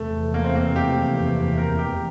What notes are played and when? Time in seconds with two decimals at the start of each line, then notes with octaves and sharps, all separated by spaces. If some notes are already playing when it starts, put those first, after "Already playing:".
Already playing: F1 E2 C3 E3 A3
0.34 A#3
0.44 C4
0.55 A#3
0.76 G4
1.58 A#4
1.79 G4